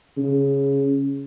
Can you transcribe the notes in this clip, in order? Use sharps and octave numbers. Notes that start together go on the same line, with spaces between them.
C#3